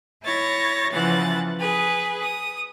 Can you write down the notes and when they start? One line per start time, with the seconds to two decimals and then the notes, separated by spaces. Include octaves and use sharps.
0.24 E4 C#5 A6 A#6
0.93 C#3 E3 F3 F#5 A6
1.59 G#4 B4
2.23 D#6